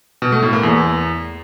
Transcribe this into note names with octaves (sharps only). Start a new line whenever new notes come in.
B2
A3
A2
A#3
E2